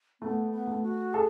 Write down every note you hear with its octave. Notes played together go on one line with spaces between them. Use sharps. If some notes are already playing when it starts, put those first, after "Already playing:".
A3 B3
B3
A3
F#4
G#4 A4